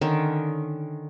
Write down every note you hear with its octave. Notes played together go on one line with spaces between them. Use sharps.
D3 D#3 C#4